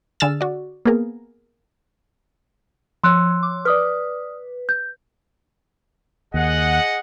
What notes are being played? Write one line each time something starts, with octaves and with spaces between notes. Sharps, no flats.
D3 G#4 E6 F6 A6 E7
F#4 D5
A#3 B3 G#4 A#4
F3 C#5 C6 E6 F#6
D6
B4 D5 D#6 F6
G6
D#2 G#4 D#5 F#5